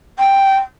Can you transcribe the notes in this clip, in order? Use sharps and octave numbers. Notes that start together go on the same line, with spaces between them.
G5